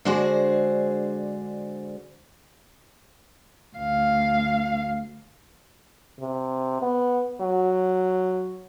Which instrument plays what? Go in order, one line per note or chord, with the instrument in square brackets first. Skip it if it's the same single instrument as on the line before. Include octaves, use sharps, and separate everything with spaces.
[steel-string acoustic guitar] D3 G#3 D4 F#4 G#4 C5
[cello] D2 F5
[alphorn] C3
B3
F#3